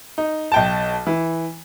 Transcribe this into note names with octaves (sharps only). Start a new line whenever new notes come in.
D#4
B1 G5 A5
E3